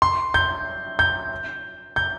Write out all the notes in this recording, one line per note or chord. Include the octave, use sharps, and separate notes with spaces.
C6
G6
G6
G6